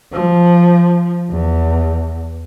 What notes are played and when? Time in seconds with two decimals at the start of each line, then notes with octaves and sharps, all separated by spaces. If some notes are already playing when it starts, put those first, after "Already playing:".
0.12 F3
1.31 E2